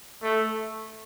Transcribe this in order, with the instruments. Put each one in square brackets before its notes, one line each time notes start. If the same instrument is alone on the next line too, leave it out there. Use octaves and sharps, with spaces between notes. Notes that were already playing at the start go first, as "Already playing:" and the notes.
[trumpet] A3